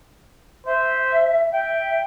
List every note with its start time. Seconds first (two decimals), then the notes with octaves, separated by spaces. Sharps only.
0.66 C5 E5
1.53 E5 G5